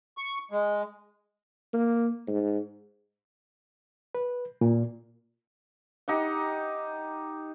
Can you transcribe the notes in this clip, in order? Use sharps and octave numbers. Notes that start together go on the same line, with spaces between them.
C#6
G#3
A#3
G#2
B4
A#2
D#4 G4 F#5